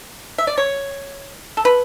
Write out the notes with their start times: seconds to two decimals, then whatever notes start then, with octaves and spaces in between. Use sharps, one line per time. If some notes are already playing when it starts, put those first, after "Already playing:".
0.38 E5
0.47 D5
0.58 C#5
1.57 A4
1.65 B4